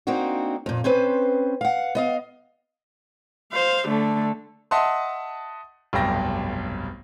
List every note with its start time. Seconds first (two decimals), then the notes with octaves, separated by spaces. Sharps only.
0.07 A#3 C4 D4 D#4 F#4
0.66 F2 A#2
0.84 C4 C#4 B4 C5
1.61 F5 F#5
1.95 B3 D#5 F5
3.53 C5 F5
3.89 D3 A3
4.71 D#5 E5 F#5 A5 C6 D#6
5.93 F1 B1 G2 G5 A#6